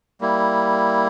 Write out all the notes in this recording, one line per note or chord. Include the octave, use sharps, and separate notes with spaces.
G3 A#3 E4